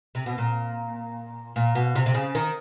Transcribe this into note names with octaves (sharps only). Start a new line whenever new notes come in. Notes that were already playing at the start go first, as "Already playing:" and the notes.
C3
B2
A#2
A#2
B2
C3
C3
C#3
D#3